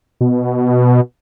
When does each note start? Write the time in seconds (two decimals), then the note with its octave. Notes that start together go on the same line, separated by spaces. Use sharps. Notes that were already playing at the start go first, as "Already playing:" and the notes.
0.21 B2